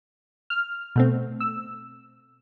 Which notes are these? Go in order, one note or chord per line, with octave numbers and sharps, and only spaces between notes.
F6
B2 A3 C4
E6